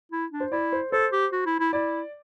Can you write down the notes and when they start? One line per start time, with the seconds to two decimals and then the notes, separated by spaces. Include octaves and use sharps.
0.12 E4
0.32 D4
0.40 C5
0.52 E4 D5
0.72 C5
0.92 A4 C5
1.12 G4
1.32 F#4
1.46 E4
1.60 E4
1.73 E4 D5